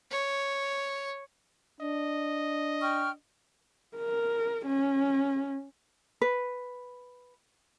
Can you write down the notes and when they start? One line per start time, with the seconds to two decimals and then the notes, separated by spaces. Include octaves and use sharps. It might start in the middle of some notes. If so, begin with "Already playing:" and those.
0.11 C#5
1.81 D4 D#5
2.81 G5 C#6 F6
3.97 A#4
4.66 C#4
6.22 B4